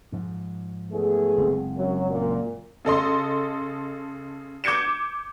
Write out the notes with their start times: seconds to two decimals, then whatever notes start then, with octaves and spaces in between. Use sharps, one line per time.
0.12 G#2 F3
0.92 E2 A3 G#4
1.37 F#1 G#3 C4
1.77 F#2 F#3
2.10 F#2 A#2
2.85 C#3 A4 D#5 C6
4.64 D6 G6 G#6 C#7 E7